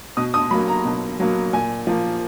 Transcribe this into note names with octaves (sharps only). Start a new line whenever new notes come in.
B2 D#6
D#6
F#3 A#3 B5
A#5
B2
F#3 A#3
A#2 G#5
F3 A#3